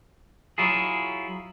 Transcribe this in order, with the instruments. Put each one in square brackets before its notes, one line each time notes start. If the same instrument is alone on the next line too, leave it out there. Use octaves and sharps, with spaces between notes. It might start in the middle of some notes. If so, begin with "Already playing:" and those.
[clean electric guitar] F#3 E4 F4 G#4